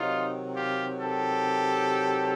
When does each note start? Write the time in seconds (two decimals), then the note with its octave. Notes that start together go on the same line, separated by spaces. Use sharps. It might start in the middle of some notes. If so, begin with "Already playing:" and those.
Already playing: C3 D#3 F#3 D#4 F4
0.55 F4 G4
1.00 G4 A4